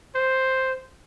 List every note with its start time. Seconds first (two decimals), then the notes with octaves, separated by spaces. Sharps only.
0.15 C5